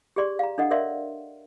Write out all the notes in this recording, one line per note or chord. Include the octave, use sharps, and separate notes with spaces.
G4 G#4 D5 C6
F5 A#5
D4 A4 D#5 F#5
A#4 C#5 D5 E5 F5 C6